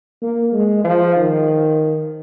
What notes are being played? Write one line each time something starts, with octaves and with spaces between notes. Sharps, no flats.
A#3
G#3
F3
D#3